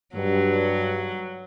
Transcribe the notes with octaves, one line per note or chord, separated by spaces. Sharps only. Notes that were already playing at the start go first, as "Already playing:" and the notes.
G2 F#3